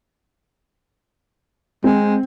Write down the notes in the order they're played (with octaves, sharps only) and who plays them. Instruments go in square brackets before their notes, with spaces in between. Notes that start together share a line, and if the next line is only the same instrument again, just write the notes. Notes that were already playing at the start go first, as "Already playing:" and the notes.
[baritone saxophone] G#3 [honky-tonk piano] C4